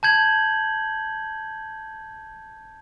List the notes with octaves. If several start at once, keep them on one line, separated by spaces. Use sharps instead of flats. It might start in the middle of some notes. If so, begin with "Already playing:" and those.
A5 G6 G#6 F#7